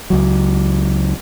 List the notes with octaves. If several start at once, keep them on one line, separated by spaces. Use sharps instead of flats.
C#2 F#3